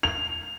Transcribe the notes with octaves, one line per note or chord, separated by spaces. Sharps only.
F7